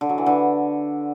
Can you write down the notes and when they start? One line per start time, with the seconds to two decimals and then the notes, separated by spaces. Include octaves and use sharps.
0.01 D3
0.09 F#3
0.18 E3
0.26 D3